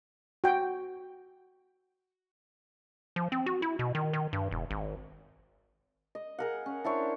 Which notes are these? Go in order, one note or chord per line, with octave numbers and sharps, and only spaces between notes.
F#4 G5
F3
C4
F#4
E4
B2
D#3
D#3
G2
E1
G#1
D#5
G#4 A#4 F#5
C#4
D4 E4 C5 C#5